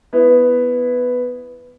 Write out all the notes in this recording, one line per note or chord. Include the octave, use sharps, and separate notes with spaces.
B3 E4 B4